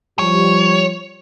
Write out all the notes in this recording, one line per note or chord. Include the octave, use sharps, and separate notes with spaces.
F3 G3 C#5